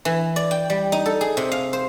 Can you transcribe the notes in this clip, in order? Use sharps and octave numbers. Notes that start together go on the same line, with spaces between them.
E3
D5
G5
G3
D#4
A4
G#4
C3
F5
C5